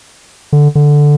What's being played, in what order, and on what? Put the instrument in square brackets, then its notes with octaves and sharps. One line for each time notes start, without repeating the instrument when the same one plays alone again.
[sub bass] D3
D3